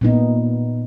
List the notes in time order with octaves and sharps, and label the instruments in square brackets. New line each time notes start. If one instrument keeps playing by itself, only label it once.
[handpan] A#2 B3 D#4